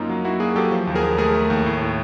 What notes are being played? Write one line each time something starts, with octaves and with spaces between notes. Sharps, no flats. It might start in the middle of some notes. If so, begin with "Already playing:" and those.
Already playing: F#2 A#3 D#4 F4
F#3
A#3 E4 F#4
A#3 F#4 G#4
F#3 G4 A4
F3
D#2
G#4 A#4
D#2
A3 G#4 A#4
A3
D#2
A2
A2